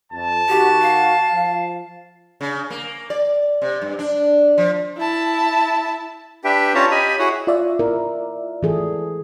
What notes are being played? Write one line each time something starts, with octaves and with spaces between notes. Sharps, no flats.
F2 A5
D#3 F#4 G4
F5
F3
C#3
A#3
D5
C3
G2
D4
F3
E4 A5
D4 G4 B4 E5 G5
C#4 F4 G4 C#5 A5 A#5
G4 D#5 G#5 B5
E4 F#4 G#4 C#5 F#5
F4 D5 E5
E4 A#4
E3 G#4 A4